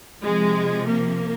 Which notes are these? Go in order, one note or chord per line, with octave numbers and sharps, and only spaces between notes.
C3 F3 G#3
A#3